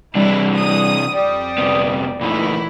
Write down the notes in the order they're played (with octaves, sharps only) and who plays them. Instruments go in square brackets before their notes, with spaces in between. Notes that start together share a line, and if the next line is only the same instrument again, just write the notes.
[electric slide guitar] C3 E3 D4 [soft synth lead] G3 [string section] E4
[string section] D#6
[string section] F2 G3 [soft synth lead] D#6
[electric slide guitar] G2 C3 B3
[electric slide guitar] A#2 A3 D#4 [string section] E3 E4 [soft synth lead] B5